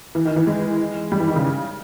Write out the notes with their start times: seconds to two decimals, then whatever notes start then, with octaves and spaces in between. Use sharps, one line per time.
0.15 E3
0.25 D#3
0.36 E3
0.47 G#3
1.12 G3
1.20 E3
1.28 D#3
1.36 C#3